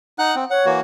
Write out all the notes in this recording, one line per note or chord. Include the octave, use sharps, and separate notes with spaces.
D#4 F#5 F#6
C4
C#5 F#5
E3 A#3 F#4